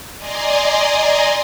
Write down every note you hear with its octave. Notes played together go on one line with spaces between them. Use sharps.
D5 D#5 G#5 A#5 C6